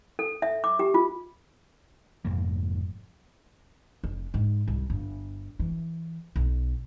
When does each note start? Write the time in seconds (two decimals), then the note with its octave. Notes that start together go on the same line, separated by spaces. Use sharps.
0.19 A4
0.42 E5
0.64 D6
0.79 G4
0.94 F4
2.25 F1 F2 G#2 A#3
4.04 F1
4.34 G#2
4.68 C2
4.90 G1
5.59 E3
6.36 B1